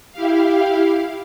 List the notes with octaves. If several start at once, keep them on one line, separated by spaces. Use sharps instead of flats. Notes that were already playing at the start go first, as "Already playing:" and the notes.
E4 G4 F5